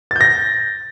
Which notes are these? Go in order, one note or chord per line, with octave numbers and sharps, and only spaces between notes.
G6 A6 A#6